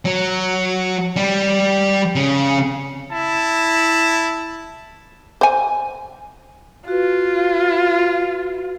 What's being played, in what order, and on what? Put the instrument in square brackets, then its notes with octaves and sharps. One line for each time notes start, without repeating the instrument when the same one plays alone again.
[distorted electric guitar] F#3
G3
C#3
[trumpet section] E4 A5
[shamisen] C5 G#5
[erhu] F4 [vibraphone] F#4 B4